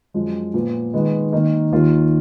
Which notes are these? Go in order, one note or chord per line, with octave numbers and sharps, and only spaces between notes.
F#2 F3 G#3
A#2 F3 B3
D#3 G#3 B3
D#3 A#3 D#4
D#2 D#3 A#3 F4